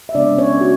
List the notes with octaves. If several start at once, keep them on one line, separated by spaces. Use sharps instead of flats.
E5
C#3 G#3 B3 D4 D5
C#4 C#5
F#4